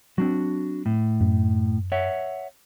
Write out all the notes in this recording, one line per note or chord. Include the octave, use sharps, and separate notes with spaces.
F#3 C4 D4 F#4
A2
F#2
C#5 E5 F#5